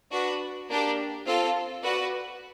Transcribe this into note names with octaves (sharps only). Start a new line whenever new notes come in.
D4 F#4 B4
A#3 D4 G4 A#4
C4 F4 A4
F#4 B4 D5